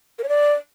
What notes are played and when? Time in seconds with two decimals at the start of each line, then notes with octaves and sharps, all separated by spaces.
0.19 A#4
0.24 C#5
0.29 D5